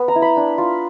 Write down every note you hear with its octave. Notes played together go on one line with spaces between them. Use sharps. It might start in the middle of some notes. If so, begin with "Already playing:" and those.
Already playing: B3
A#5
E4
B5
D4
F4